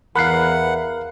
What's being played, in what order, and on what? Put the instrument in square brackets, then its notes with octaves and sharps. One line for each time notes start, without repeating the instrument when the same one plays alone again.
[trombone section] E2 E3 [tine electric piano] A#4 F5 [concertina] F#5 [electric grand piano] B5 F#6 C7